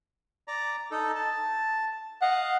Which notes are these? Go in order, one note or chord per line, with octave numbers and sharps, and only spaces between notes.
D5 A#5
D#4 A4
A5
D#5 F5 F#5